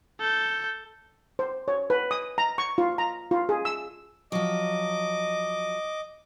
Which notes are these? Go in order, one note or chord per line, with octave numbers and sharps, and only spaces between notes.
A4 G6
C5
C#5
B4
D#6
A#5
C#6
F4
A#5
F4
G#4
E6
F3 F#3 D#5 D6